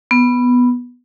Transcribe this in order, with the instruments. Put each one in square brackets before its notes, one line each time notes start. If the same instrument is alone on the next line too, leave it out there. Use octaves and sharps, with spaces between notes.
[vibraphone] B3